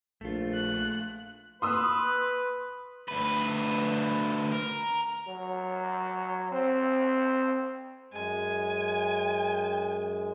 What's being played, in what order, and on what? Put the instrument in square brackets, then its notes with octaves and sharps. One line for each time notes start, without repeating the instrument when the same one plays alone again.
[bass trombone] A#1 [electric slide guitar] A3 F4
[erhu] F#6
[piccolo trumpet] B4 [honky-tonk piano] C6 D#6 E6
[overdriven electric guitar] D2 B4
A#4
[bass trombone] F#3
C4
[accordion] F#2 G#3 [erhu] G#5